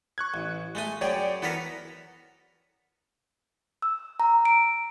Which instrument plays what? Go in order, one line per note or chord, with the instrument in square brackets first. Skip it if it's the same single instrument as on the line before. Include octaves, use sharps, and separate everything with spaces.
[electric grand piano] C#6 F#6 G#6
[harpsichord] A1
G#3 A3 G#5
[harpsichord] F#2 G#4 [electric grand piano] C#5 D5 G5
[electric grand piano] E3 B6 [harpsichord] B3 A4 A#4
[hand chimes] E6
A#5
D7